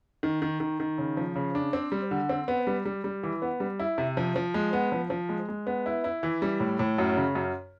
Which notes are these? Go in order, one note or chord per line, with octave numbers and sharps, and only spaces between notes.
D#3
D#3
D#3
D#3
C#3
F3
C#3
D4
C4
G3
D3
C4
B3
G3
G3
G3
E3
B3
G3
E4
C3
F3
F3
G#3
B3
F3
F3
G#3
G#3
B3
E4
E4
E3
G3
A2
A2
F#2
C#3
F#2